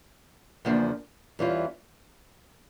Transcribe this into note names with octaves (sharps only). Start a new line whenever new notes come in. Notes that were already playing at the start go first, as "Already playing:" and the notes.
E2 C#3 F3 A#3 D4
E2 E3 G3 C#4 F4